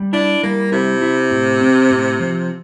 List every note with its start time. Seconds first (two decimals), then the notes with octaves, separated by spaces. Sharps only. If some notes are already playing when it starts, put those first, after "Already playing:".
Already playing: G3
0.13 D4 E4
0.43 G3 A#3
0.72 C3 E4
1.02 E4
1.31 A2
1.61 C4
1.90 A2
2.20 F3